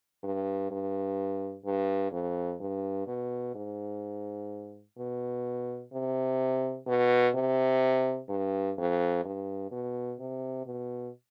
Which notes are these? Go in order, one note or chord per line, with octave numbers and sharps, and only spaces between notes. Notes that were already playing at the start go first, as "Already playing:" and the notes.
G2
G2
G2
F2
G2
B2
G#2
B2
C3
B2
C3
G2
F2
G2
B2
C3
B2